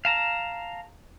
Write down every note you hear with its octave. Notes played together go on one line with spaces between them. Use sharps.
F5 A5 A#5